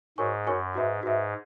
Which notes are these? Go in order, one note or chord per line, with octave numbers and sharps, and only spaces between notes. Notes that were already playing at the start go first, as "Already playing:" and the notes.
G#2 F#4 A#4 C#5 G#5 C#6
F#2 F#4 A#4 C#5 G#5 C#6
G#2 F#4 B4 E5
G#2 F#4 B4 E5